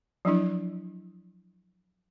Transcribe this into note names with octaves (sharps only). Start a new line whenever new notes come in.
F3 F#3 D4 E4